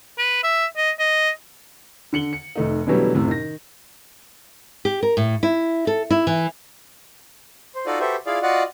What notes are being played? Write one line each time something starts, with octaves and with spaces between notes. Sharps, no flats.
B4
E5
D#5
D#5
D3 C#7 F#7 G7
C#7
F1 A3 D#4
B2 D3 E3 F#3 G3 A3
F#1 A2 C3
D#3 A#6
G4
A#4
A2
E4
A4
E4
E3
C5
D#4 F4 F#4 A4 D5 D#5
F#4 G4 A4 B4 C5 E5
E4 F4 G#4 D5 F5
F4 F#4 D5 D#5 F#5